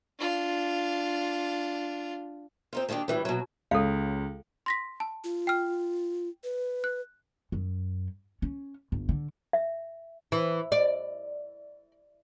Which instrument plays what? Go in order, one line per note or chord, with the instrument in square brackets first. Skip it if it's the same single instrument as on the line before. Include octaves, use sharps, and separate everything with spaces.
[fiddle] D4 F4
[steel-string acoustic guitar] C4 D#4 F4
D#3 A#3 D4 F#4 G4
A2 E3 G3
B2 F#3
[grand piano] C#2 [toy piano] A4 F5
[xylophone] C6 A#6 B6
A5
[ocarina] F4
[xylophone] G5 F6
[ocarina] B4
[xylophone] F#6
[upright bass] F#2
C#4
G1
D3
[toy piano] E5
[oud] E3
D5